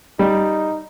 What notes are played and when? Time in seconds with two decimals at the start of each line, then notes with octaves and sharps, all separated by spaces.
0.19 G3 D#4